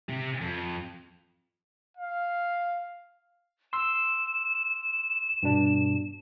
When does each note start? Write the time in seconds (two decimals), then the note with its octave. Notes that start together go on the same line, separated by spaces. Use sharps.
0.09 C3
0.41 F2
1.97 F5
3.73 C6 E6 E7
5.43 G2 B2 D4